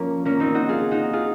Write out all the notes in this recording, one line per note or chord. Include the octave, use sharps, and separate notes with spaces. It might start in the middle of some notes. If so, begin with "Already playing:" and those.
Already playing: F3 A#3 C#4
A#3 C#4
C4 D#4
D#4 F#4
F4 G#4
D#4 F#4
F4 G#4